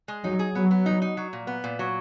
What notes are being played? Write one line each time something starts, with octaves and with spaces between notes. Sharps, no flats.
G#3
F#3 D#4
G#4
F#3 B3
B3
D#4
D#4
F#3
A#2
B3
A#2
F#3